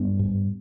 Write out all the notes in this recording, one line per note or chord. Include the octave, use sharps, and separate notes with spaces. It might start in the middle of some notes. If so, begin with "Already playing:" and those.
Already playing: G2 B3
G#2